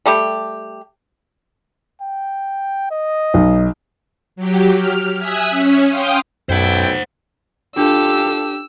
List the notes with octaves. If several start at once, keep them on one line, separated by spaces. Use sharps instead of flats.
G3 A3 G4
G5
D#5
B1
F#3 G4
F6
E5 G#5 D#6 E6 F#6 B6
C#4
F5 G5 C6 D#6
B1 F#2 E4 A4 C5 F#5 G5
D4 F4 G4 A4 E6